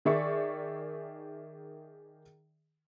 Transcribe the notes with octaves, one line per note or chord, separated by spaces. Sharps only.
D#3 G#4 D5 E5 C#6